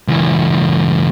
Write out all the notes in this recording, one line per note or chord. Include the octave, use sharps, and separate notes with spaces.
C#2 E3